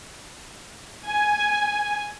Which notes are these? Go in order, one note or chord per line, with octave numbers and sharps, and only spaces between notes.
G#5